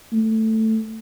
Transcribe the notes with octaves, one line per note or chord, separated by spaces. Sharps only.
A3